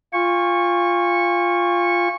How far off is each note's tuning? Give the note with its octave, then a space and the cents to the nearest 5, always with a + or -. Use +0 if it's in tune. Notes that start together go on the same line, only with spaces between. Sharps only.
F4 +0 G#5 -45 C#6 -10